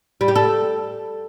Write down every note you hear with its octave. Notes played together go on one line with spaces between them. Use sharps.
G3
G4
A4